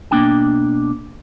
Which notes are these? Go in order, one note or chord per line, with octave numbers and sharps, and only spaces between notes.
B2 A#3 D4 G5